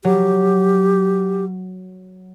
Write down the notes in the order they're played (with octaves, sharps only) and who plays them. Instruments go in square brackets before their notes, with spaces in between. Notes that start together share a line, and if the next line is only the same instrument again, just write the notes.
[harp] F#3 [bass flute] G4